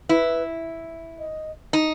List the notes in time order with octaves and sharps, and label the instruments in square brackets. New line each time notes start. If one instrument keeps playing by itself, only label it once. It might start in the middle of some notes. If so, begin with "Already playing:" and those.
[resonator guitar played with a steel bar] E4 [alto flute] B4
[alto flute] D#5
[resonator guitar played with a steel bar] D#4